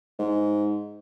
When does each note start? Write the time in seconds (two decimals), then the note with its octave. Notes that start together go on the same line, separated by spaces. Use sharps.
0.19 G#2